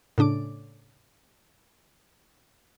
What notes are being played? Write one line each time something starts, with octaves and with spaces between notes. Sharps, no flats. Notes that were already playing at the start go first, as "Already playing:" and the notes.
A2 C#3 D4 D6